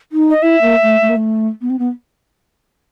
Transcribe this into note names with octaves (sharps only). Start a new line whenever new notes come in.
D#4
D#5
E4 E5
A#3
A3
A3
A#3
A3
B3
C4
B3